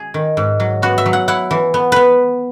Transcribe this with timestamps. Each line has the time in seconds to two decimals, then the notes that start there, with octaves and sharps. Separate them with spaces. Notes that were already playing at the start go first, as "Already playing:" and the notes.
Already playing: G#4
0.14 D#3
0.37 G#2
0.60 F#3
0.82 B3 F#4
0.98 E5
1.06 F#3
1.13 F#5
1.28 E4 F#5
1.51 E3
1.74 B3
1.92 B3 B4